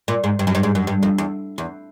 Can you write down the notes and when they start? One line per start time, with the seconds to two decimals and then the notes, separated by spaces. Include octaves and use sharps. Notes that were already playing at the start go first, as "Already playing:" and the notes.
0.08 A#2
0.24 G#2
0.39 G2
0.47 F#2
0.55 G2
0.63 G#2
0.75 F#2
0.87 G2
1.03 F2
1.18 E2
1.58 E2